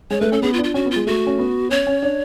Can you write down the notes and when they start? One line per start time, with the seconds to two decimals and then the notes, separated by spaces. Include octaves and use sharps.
0.10 G#3 C#5
0.21 A3 B4
0.32 C#4 A4
0.42 B3 G#4
0.53 F4
0.59 D4
0.64 F4
0.74 C#4 F#4
0.86 B3
0.91 F4
0.96 G#3
1.07 A3 F#4
1.27 C#4
1.39 B3
1.70 C#4 C#5
1.87 C#4
2.03 D4